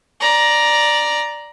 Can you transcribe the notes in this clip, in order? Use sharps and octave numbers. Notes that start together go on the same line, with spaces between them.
D5 A#5